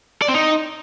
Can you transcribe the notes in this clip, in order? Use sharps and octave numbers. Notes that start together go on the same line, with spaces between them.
D5
C4
D#4